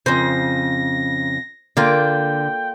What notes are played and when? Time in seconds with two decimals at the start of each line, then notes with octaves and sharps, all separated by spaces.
0.06 F2 C#3 C5 A#6
1.77 D3 A#3 F4 G5